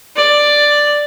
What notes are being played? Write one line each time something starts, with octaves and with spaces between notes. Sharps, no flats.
D5